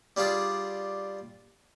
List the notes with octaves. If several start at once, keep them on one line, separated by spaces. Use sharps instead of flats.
G3 D4 F4 G#4